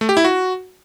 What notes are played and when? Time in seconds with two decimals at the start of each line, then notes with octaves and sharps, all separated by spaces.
0.01 A3
0.09 G4
0.17 E4
0.24 F#4